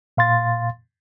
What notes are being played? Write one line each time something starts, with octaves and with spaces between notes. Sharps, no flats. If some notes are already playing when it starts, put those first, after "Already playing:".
A#2 F5 C6 A6